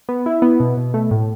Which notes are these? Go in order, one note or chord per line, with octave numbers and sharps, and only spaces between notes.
B3
E4
B3
B2
B2
A3
A2